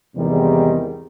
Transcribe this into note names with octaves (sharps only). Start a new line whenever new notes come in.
E2 G#2 C3 D#3 G3 G#3